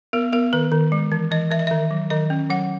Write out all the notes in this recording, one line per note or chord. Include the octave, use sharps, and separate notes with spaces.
B3 A#4
B3 A#4
D#3 B4
D#3
G#3
E3
E3 D#5
E3 E5
D#5
D#3 E5
F#3
D#3 D#5
C#4
F#3 F#5